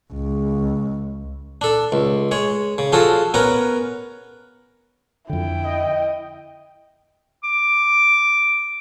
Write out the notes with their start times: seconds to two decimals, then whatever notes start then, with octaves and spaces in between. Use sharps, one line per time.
0.13 C#2
1.61 D4 A4
1.92 C#2
2.31 G#3 C#5
2.78 C#3
2.92 F3 F4 F#4 G#4 A4
3.34 B3 C#4 A#4 F#5
5.29 F2 D3 E4 G5
5.64 D#5
7.44 D6